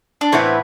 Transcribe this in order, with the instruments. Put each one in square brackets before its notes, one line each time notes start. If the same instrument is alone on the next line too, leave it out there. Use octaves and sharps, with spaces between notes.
[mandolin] D4
[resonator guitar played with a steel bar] A2 E3 B3 E4 B4 [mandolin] C4